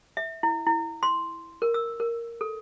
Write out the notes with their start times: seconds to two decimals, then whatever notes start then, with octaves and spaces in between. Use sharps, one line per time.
0.17 E5
0.43 E4
0.67 E4
1.03 C6
1.62 A#4
1.74 E6
2.00 A#4
2.41 A4